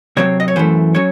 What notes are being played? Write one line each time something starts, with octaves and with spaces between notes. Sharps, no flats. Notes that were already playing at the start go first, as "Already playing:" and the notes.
C3 F#3 C4 C#5
D#5
C#5
F#2 E3 A3 C5
F#3 C#4 C#5